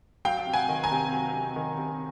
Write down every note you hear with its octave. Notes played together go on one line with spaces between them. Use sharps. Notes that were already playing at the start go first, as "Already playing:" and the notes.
F#3 F5 G5
C3
F#5 G#5
D#3
G#5 A#5
C3
F#3
C3
D#3
C3